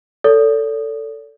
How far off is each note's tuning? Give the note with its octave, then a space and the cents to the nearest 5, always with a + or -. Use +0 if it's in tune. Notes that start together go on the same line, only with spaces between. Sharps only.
A4 +15 D5 -45